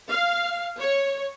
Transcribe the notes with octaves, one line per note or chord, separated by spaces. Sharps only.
F5
C#5